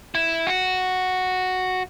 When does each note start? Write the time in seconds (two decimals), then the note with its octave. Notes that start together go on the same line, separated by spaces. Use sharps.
0.15 E4
0.47 F#4